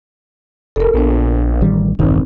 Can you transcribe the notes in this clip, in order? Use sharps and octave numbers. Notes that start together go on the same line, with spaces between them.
F1 A4 A#4
A#1 B3 D4
A1 D#3 G3
E1 A1 G2 D#3 C4 D#4